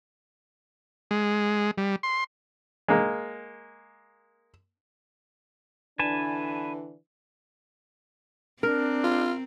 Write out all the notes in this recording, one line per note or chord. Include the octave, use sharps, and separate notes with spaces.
G#3
G3
C6
G#3 A#3
D3 E3 D4 B4 G#5 A5
C4 D4 A#4
F4